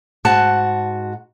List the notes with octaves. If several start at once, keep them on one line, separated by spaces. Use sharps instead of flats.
G#2 F#4 F#5 A5